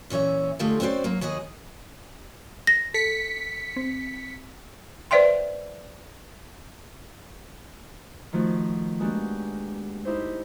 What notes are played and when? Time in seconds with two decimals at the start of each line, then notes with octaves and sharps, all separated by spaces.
0.10 A#2 E3 C#4 C#5 E5
0.59 D3 G#3 A3 F4 G4 A4
0.80 C4 C#4 F#4 A#4 C5 D5
1.04 F#3 A#3
1.21 D#2 F#4 G#4 D#5
2.67 A#6
2.94 A4 B6 C#7
3.76 C4
5.11 B4 C5 D5 E5 G5 C6
8.33 D#3 F3 A3 F#4
9.00 G#3 A#3 B3 D4 F#4 G4
10.05 D#4 E4 G4 C5